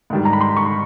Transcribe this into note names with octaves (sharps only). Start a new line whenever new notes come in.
G#2 D#3 G3
A#5
B5
C6
C#6